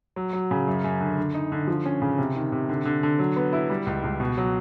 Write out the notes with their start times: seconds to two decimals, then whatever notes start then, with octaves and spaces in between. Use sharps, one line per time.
0.16 F#3
0.33 F#3
0.51 C#3
0.68 F#2
0.84 F#2
1.01 D3
1.18 D3
1.34 D#4
1.52 D3
1.68 F3
1.86 C#4
2.02 C#3
2.18 C3
2.36 D#3
2.52 C3
2.69 D3
2.85 D3
3.03 D3
3.19 F#3
3.36 B3
3.53 E4
3.70 G3
3.87 C#2
4.04 C#2
4.20 B2
4.38 F#3